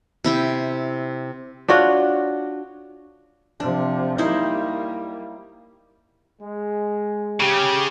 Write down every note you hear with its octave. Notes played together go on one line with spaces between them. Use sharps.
C3 E4 G5
D4 F4 F#4 C#5
C3 F3 D4
G3 A#3 D#4 E4 C5
G#3
C#3 G4